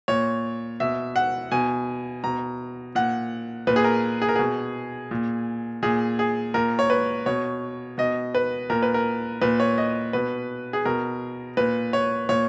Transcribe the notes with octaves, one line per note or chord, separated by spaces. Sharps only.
A#2 C#5
B2 E5
F#5
B2 G#5
B2 A#5
A#2 F#5
A#2 B4
G#4
A#4
G#4
A#4
B2 G#4
A#2
A#2 G#4
G#4
A#2 A#4
C#5
B4
B2 C#5
B2 D#5
B4
A#2 A#4
B4
A#4
A#2 B4
C#5
D#5
B2 B4
G#4
B2 A#4
A#2 B4
C#5
A#2 C#5